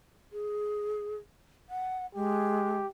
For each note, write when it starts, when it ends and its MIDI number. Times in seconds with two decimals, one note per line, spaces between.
0.33 1.16 68
1.69 2.06 78
2.15 2.80 56
2.15 2.87 67